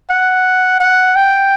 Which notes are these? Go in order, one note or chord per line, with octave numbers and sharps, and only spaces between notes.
F#5
F#5
G5